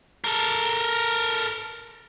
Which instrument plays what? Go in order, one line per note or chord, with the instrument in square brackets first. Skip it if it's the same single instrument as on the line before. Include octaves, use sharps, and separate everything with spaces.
[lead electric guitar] A4 A#4